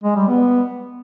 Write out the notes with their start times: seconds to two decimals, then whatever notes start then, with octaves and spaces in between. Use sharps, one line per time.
0.04 G#3
0.16 G3
0.28 B3